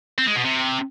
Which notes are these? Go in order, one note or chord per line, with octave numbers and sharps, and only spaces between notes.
C4
G#3
B2
C3